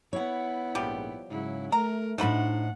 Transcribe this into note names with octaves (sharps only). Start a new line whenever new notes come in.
B3 E4 C#5 F#5
A#1 G#2 F3 G3 G4
G#2 C#3 F#3 E4
A3 A#4 A#5
A2 A3 D4 D#4 F#4 C5 F#5 B5